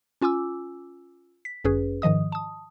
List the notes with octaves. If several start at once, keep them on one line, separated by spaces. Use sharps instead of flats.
C#4 F4 G#5 D6 E6
B6
G1 F#2 C#4 G#4 B4
G#2 D#3 F3 D#5 D#6
A5 D#6